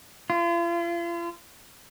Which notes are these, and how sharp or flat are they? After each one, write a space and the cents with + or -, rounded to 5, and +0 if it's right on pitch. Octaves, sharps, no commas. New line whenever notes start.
F4 -40